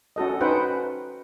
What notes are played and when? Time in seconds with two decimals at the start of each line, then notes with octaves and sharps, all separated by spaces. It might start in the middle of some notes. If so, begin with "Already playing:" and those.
0.16 C#4 F#4 A4 D#5
0.41 C#4 D#4 B4 C5 F#5 G5